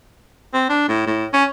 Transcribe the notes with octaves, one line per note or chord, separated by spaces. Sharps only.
C4
D4
A2
A2
C#4